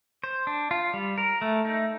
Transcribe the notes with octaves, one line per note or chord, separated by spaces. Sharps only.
C5
D4
F4
G3
A#4
A3
D#4